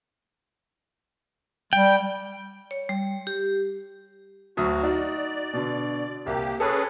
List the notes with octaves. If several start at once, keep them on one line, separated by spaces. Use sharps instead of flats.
G3 G5
C#5
G3
G4
D2 F#3 F#4 D#6
D#4 F#4 D5
B2 D3
C2 A#3 G4
C#4 G#4 A4 B4